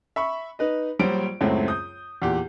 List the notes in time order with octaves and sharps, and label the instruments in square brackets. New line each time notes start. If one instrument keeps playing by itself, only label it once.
[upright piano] E5 B5 C#6
D#4 B4 D#5
A#1 F#3 G3 C5 D7
C#2 F#2 A2 F#3 A3 C4
D#6 G6
E2 A#2 G4